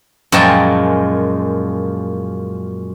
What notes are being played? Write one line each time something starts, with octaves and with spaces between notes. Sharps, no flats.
F#2 A#2 F3 G#3 G5 A5